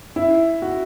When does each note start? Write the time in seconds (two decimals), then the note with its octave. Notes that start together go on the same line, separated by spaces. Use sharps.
0.16 E4
0.62 F#4